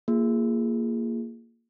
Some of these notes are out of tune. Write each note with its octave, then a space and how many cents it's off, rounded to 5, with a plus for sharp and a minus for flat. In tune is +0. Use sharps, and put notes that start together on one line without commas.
A#3 -10 F4 -20 G#4 +0